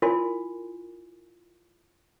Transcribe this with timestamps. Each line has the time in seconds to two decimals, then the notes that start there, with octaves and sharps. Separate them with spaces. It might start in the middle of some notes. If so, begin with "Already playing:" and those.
0.02 E4 F4 A#4 G#5 C6